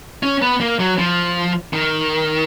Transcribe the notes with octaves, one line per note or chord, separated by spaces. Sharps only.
C#4
B3
A#3
F#3
F3
D#3